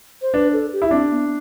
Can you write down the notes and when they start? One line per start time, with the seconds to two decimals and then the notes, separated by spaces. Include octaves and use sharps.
0.22 C5
0.34 D4 B4
0.53 A4
0.73 G4
0.82 E4
0.91 C4 D4
1.11 B3